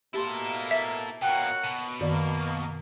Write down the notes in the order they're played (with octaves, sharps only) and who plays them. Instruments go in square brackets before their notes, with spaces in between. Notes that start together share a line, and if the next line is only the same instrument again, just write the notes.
[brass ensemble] B2 A#3 [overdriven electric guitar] E4 A4 [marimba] G4 C6
[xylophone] E5
[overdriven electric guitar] B2 A#3 [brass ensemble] A#4 C#5 F#5 [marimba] G5
[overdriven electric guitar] B2
[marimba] F#2 D#3 D5 [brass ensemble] A#3